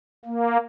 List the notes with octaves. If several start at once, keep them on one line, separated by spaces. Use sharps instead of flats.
A#3